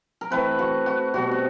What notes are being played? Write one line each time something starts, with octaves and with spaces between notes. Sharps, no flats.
A#4
E3 A3 C4 B4
F#4
F#4
B2 G3 C4 F#4
F#4